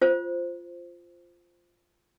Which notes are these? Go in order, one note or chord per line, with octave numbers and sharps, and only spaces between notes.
F4 C5